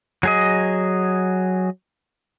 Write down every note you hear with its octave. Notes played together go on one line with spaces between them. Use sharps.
F#3 G#4 D#5